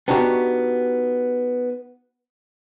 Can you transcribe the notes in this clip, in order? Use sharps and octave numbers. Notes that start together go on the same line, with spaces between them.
B3 D4 D#4 F#4 G4